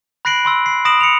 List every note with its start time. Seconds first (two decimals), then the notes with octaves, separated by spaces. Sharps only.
0.25 B5 F#6 A#6 C7 D7 F#7
0.45 B5 C6 E6
0.66 C7
0.85 B5 D#6 A#6 D7 E7 F#7
1.01 C#7 F7